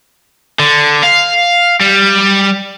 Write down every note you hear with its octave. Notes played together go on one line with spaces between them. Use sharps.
D3
F5
G3